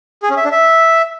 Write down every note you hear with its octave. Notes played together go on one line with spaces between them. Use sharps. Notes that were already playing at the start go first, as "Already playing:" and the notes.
G#4
C#4
E5
D4
E5